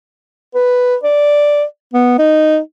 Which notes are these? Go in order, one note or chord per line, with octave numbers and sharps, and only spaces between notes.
B4
D5
B3
D#4